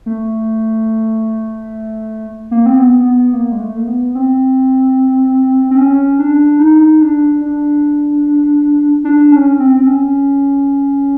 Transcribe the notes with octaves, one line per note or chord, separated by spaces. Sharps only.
A3
A#3
C4
B3
B3
A#3
G#3
A3
A#3
B3
C4
C4
C#4
D4
D#4
D4
D4
D4
C#4
C4
C4
C#4